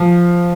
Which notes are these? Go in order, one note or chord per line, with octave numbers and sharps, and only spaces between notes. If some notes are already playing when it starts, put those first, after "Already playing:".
Already playing: F3